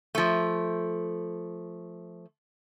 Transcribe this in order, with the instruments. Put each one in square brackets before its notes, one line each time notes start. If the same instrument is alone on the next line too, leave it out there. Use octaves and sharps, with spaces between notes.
[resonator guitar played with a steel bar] F3 A3